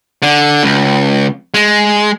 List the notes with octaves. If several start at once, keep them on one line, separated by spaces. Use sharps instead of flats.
D3
C#2
G#3